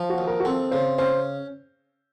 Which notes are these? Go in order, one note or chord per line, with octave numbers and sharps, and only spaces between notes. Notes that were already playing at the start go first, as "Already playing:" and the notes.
Already playing: F3
F#4
D#2
A#4
F#4
C4 A4
C#3 C5
C#4 C5